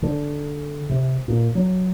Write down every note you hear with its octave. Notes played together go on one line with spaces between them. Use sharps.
D3
C3
A#2
F#3